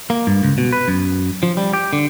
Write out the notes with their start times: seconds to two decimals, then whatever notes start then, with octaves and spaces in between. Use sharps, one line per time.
0.10 A#3
0.27 G2
0.43 C#2
0.58 B2
0.73 B4
0.88 F#2
1.43 F3
1.57 G3
1.73 G4
1.93 D3